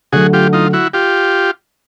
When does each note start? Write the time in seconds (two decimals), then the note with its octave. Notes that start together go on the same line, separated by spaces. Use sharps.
0.12 D3 F#3 A3 F#4 G#4
0.33 F4 G4
0.53 D#4 F4
0.73 E4 F#4
0.93 F4 G4